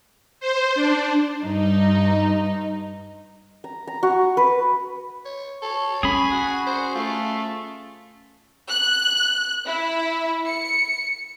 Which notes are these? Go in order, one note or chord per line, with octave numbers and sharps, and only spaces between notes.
C5
D4
G2 D#4
A#5
A#5
F#4
B4
C#5
A4 C#5
C#4 G#4 G#5 B5
F#4
C5
A3 F4
F#6
E4
C#7